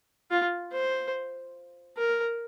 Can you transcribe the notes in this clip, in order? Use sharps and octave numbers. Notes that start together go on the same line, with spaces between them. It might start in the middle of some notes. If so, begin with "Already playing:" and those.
F4
C5
A#4